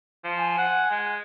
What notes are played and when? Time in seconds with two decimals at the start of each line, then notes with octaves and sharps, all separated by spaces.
0.24 F3
0.38 G#5
0.58 F#5
0.91 G#3